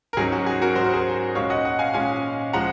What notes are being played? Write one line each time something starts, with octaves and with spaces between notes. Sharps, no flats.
A#4
G#2 F#3 C#4 G#4
F#4
G#4
F#4 A#4
G#2 F#3 C#4 C5
A#4
G#4 C5
A#2 G#3 C#4 C#5 F5
D#5 F#5
D#5 F#5
F5 G#5
A#2 G#3 C#4 F5 G#5
F3 G#3 F#5 A#5